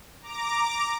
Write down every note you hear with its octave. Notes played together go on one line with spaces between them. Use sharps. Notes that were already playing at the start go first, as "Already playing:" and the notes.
A#5 D6